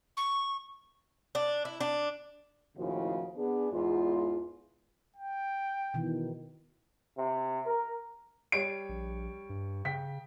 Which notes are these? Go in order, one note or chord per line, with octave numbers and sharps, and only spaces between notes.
C#6
D4
E4
D4
D#2 A2 C#3 F3 E4 F#4
B3 D4 G#4
E2 G#2 F4
G5
B2 D#3 E3
C3
A#4
G3 C#5 D7
A#1
G2
C#3 G5 B6